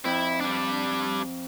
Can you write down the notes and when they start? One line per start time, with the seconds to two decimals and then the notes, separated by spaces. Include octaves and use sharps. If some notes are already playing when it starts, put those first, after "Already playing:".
0.05 F2 E4 G6
0.41 G3 D4